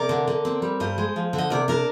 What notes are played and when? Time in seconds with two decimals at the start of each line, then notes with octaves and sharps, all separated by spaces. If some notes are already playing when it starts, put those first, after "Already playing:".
Already playing: C3 A#4 D5
0.09 D3
0.27 D3
0.45 C4
0.62 G3
0.80 G2 C5 D#5
0.98 G#3
1.16 F3
1.33 D3
1.38 D#5
1.50 C3 A#4 D5
1.68 D4 A#4 D5